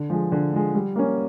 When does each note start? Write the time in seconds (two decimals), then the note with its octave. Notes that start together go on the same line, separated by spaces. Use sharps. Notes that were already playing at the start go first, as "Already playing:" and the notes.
Already playing: D3
0.10 F3 G#3
0.32 D3
0.53 F3 G#3
0.75 G3
0.96 A#3 C#4